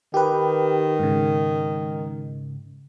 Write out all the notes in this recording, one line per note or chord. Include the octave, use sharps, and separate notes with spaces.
D#3 G4 B4
G#2 C#3